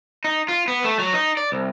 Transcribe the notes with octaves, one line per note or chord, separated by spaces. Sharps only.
D#4
F4
B3
A3
F#3
D#4
D5
C2